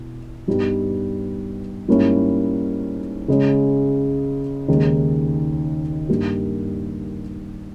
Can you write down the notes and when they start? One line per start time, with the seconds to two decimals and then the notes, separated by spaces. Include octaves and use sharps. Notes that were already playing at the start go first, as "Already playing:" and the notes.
Already playing: B2 E4
0.48 G2 G3 B3 D#4 G4
1.88 G#2 G3 A#3 C#4 E4
3.28 C#3 G#3 C#4
4.68 D#2 C#3 G#3 D#4
6.09 G2 G3 A#3 D#4 G4